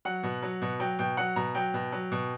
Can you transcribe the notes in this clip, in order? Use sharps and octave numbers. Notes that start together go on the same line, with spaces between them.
F#3 F#5
B2
F#3
B2
F#3 G5
B2 G5
F#3 F#5
B2 A#5
F#3 G5
B2
F#3
B2